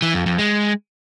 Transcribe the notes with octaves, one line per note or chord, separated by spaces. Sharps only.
E3
F2
F2
G#3